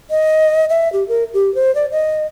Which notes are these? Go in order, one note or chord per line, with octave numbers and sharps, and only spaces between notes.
D#5
E5
G4
A#4
G4
C5
D5
D#5